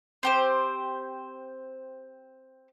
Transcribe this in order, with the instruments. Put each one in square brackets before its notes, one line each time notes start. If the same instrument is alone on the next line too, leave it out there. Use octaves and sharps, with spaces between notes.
[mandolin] C4 G4 C5